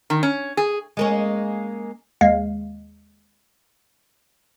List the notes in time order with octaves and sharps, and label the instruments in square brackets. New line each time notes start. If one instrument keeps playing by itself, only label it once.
[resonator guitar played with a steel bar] D#3
C#4
G#4
[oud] G#3 A#3 C#4
[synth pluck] D#2 G#3 F5